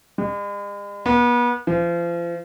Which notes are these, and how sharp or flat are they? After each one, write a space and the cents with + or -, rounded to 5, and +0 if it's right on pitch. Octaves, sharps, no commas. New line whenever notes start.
G#3 -45
B3 -35
F3 -35